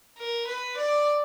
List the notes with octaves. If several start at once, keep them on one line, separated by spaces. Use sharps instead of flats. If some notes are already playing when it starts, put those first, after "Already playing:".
A#4
B4
D5